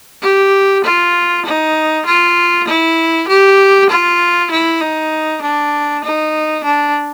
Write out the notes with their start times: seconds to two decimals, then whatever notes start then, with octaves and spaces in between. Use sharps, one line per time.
0.22 G4
0.84 F4
1.45 D#4
2.06 F4
2.68 E4
3.28 G4
3.90 F4
4.51 E4
4.81 D#4
5.42 D4
6.04 D#4
6.64 D4